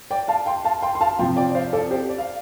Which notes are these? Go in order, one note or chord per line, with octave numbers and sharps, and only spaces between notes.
D5 G5
F5 A5
G5 C6
F5 A5
G5 C6
C6
F5 A5
C3 F3 G5 C6
D5 G5
D5
C5 F5
A4 D5
G4 C5
D5
F5